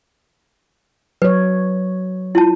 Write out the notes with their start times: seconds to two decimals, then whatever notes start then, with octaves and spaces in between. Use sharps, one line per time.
1.22 F#3 B4 C#5
2.35 E4 F4 A5